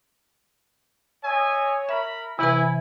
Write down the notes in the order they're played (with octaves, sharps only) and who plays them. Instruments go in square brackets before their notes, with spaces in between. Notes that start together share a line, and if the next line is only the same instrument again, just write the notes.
[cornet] C#5 [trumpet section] D#5 E5 G#5
[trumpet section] A#4 B5 [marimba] E5
[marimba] C3 E3 B4 [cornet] E4 [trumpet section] G#5